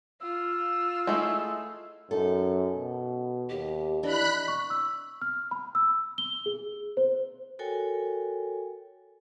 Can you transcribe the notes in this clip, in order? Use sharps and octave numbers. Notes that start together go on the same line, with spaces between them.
F4 E6
G#3 A3 E4
F#2 D#4 A4
B2
D#2 G4
E3 D4 D5 D#5 B5 F#6
C#6
E6
F6
B5
E6
G7
G#4
C5
F#4 A4 A#4 C#5 G5 G#5